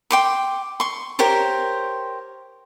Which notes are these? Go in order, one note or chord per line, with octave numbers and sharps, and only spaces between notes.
G5 C6 D6
C6 C#6
G4 A#4 C5 C#5